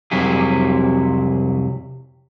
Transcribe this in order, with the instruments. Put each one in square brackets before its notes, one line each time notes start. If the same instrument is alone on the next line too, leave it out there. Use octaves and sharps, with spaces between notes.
[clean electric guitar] C2 F2 C3 F#3 E4 G#4